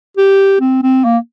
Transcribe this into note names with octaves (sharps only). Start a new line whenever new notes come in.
G4
C4
C4
A#3